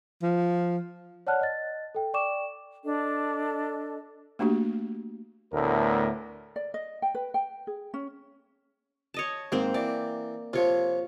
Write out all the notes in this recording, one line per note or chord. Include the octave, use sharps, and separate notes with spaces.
F3
C#5 D5 F#5 A5 F6 F#6
D#5 A6
A4 G5
D5 G5 C#6 D6 E7
D4 A4 D#5
A3 A#3 D4 F#4 G4
D2 A2 B3 A#4
D5
D#5
G5
B4
G5
G#4
C#4
C#5 D#5 A5
G#2 A#3 C4 C5
E3 D5
C3 F3 F4 C#5